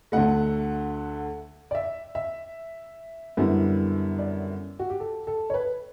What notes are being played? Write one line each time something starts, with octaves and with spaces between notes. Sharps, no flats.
D2 D3 A3 F#5
D5
E5
E5
F#2 D3 G3 B3 E4
D5
F#4
G4
A4
A4
C#5
B4